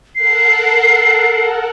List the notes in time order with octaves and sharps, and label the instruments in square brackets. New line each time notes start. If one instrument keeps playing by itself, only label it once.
[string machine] A4 A#4 F#5 [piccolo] C7